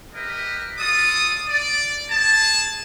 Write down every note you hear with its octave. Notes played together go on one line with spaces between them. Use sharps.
G4 A#4 B4 D#5 E5
F4 A4 D5 D#6
D5
G#4 A5